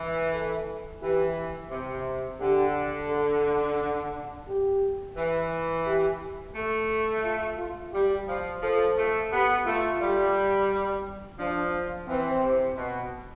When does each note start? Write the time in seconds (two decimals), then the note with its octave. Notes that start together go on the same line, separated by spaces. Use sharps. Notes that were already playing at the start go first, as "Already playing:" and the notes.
Already playing: E3
0.32 A4
1.02 E3 G4
1.71 C3
2.40 D3 G4
3.09 A4
4.48 G4
5.16 E3
5.86 G4
6.55 A3 A4
7.24 F4
7.58 F4
7.93 G3 G4
8.27 F3
8.62 F3 A4
8.97 A3
9.32 B3 G4
9.65 A3 F4
10.01 G3
11.38 F3 D4
12.08 E3 C4
12.42 C3
12.76 B2